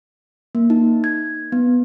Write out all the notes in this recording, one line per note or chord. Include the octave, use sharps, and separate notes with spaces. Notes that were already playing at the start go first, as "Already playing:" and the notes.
A#3
D#4
G#6
B3